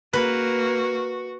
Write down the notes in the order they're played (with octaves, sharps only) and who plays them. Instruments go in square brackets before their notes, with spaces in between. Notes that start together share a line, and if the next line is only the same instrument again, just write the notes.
[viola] A#3 [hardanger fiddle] F#4 [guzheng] B4